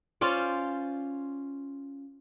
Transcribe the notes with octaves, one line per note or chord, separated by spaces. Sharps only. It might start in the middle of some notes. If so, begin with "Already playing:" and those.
C#4 F4 C5 D5